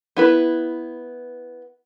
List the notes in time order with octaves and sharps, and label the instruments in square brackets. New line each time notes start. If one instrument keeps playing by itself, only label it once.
[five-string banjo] B3 E4 B4